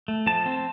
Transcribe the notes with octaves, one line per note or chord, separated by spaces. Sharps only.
A3
F3 A5
C4